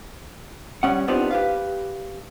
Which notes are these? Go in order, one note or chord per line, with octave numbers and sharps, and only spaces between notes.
G3 C#4 F#5
B3 C4 D4 D#4 F4 G4
G4 B4 F5